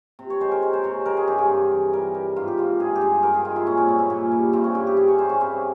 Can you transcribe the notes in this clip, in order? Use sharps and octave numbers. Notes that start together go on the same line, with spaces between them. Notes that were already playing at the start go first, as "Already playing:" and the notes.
C3
C#5
G#3 C5
A#4
G#3
C5
C3 C#5
G#3 A#4
G#4
G2 G4
G#4
G2
E3
G3 A#4
G3
G#2 F4
G4
G#2 F4
G2 G#4
G4
G2 G#4
G2 A#4
G#4
G#3 F4
E4
A#2 C#4
C4
A#2 C#4
E4
A#2 C#4
G3
G2 C4
C#4
G2 E4
G4
G2 G#4
C#5
G3 C5
C#4
G3 C4